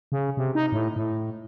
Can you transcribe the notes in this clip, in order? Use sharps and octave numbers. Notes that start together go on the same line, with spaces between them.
C#3
C3
D#4
A2
A2